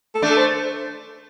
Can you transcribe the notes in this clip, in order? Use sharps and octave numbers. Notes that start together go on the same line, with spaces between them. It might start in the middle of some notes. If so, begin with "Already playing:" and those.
A4
A3 D4
A4
C5